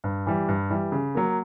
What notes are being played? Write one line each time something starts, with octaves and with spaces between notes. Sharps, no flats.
G2
E3 G3
G2
E3 G3
C#3
F#3 A#3